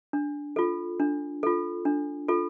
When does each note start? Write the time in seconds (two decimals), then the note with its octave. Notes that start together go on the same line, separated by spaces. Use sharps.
0.13 D4
0.56 F4 A4
1.00 D4
1.43 F4 A4
1.85 D4
2.28 F4 A4